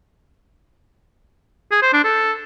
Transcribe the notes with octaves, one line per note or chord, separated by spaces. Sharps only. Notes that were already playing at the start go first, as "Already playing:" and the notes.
G#4
C5
D4
A4